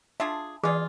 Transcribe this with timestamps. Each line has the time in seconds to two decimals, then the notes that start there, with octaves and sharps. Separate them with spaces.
0.20 D4 F4 G#4 E5
0.64 B2 E3 F4 G#4 D5